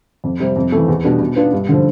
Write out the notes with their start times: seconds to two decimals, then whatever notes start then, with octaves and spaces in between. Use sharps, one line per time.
0.24 F2
0.40 C3 G3 C4
0.56 F2
0.72 E3 A3
0.88 E2
1.04 B2 G3 B3 D4
1.20 B2
1.36 B3 D4 F4 B4
1.52 G2
1.68 D3 F3